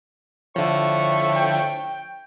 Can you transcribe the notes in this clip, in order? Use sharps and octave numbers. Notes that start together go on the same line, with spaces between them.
A2 D3 F3 E5 C#6
G5